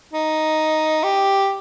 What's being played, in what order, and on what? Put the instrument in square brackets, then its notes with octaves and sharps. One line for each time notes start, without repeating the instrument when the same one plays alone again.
[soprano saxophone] D#4
G4